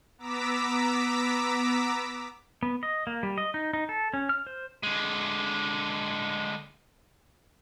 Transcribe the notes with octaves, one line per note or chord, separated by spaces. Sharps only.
B3 A#5 D6 E6 B6
B3
D#5
A#3
G3
D#5
D#4
D#4
A4
C#4
F6
C5
D3 G#3